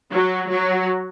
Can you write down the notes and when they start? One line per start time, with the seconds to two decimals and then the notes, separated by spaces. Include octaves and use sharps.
0.12 F#3
0.51 F#3